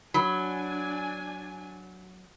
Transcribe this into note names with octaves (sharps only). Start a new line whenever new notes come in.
F#3 D4 G#5 B5